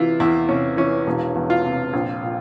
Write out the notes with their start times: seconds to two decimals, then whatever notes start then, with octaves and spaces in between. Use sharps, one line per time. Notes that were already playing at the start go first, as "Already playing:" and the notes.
Already playing: C3 E3 E4 F4
0.20 E2 E4
0.49 C3 C#4
0.77 E3 C#4
1.07 E1
1.35 E2
1.50 F4
1.64 C3
1.93 A#1
2.23 A#2